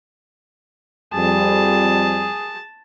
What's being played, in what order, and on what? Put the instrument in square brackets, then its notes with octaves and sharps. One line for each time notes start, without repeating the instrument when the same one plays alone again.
[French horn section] F2 G3 [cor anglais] G#4 [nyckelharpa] A5